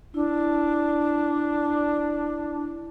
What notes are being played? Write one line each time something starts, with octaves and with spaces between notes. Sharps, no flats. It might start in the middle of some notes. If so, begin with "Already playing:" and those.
D4 E4